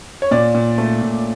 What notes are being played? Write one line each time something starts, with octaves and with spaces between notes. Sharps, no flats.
C#5
A#2 D5
A#2
A3
A#2